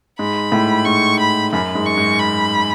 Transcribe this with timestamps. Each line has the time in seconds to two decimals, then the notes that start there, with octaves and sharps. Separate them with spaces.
0.19 G#2 B5
0.52 A2
0.86 G#2 C#6
1.20 B5
1.53 F#2 B5
1.75 G#2
1.86 C#6
1.97 G#2
2.19 B5